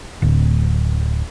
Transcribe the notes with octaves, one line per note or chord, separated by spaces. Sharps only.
D1